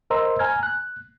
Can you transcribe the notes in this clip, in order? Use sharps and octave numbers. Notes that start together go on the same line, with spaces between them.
A#4 C5 D#5 A#5 C6 E6
G#5 A#5 F6 G#6
F#6